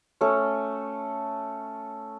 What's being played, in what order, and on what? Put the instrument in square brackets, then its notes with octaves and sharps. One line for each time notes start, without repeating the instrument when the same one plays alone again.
[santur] A3 C#4 A4 C#5